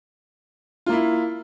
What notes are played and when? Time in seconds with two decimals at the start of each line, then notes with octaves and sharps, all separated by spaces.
0.86 F4
0.89 A#3
0.92 E4